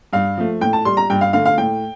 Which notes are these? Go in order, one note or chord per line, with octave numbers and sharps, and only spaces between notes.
G2 F5
F3 A3
A2 G5
A5
G3 C6
A#5
G2 G5
F5
D3 A3 F5
F5
A2 G5